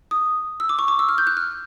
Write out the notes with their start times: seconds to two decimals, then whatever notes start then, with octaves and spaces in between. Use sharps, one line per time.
0.11 D#6
0.60 E6
0.69 D6
0.79 C#6
0.88 D6
0.99 E6
1.09 F6
1.18 G6
1.27 F#6
1.37 F6